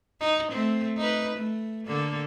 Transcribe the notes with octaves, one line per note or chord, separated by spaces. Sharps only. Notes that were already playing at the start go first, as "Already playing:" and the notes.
D#4
A3 C4
D#4 B4
A3
D3 A#3 A4